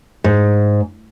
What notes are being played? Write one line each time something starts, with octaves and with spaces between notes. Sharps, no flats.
G#2